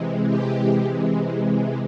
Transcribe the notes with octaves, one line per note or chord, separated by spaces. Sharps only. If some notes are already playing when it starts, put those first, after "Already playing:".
Already playing: C3 E3 G#3
G4